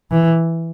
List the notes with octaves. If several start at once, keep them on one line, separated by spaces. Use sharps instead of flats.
E3